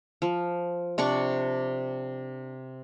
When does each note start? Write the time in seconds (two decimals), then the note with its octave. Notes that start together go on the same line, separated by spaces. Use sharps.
0.22 F3
0.98 C3 D4 D5 C#6